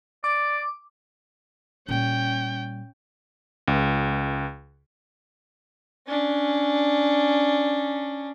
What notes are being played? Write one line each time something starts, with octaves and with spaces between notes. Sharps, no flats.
D5 D6
A#2 G3 C#4 G5
C#2
C#4 D4